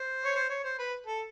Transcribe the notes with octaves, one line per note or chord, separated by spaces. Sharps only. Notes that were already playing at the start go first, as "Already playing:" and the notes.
Already playing: C5
C#5
C5
C#5
C5
B4
A4